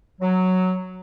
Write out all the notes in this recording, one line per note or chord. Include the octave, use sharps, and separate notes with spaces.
F#3